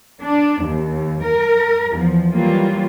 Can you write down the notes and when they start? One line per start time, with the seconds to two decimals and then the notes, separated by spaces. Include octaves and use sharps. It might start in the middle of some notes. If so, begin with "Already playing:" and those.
0.21 D4
0.63 D#2
1.21 A#4
1.92 E2 F3
2.32 E3 F#3 G3 A#3 F4